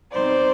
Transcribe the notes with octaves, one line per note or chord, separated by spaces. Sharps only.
B2 G3 C4 D#4 C5 D5